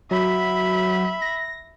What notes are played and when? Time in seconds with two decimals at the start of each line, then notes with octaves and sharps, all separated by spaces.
0.11 F#3 E5 B5
1.22 A#6